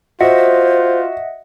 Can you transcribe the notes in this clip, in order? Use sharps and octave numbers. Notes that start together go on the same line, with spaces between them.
F4 F#4 C5 D#5 E5 F#5